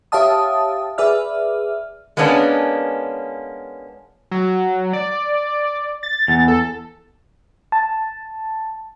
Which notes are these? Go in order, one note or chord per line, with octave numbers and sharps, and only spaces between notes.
G4 C#5 E5 F5 A5 D#6
G#4 B4 D5 E5 F6
G#3 A#3 B3 C#4 D4
F#3
D5
A6
E2
A4
A5